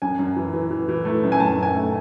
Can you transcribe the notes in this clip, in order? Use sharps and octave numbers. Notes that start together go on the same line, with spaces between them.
F#2 G#5
F#2
E3
E3
E3
E3
A3
F#2
G#5
F#2 A5
F#2 G#5
A3